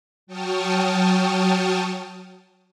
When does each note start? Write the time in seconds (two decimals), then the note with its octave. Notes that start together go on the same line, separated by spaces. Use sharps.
0.27 F#3 G5 A5 C#6 D#6 F6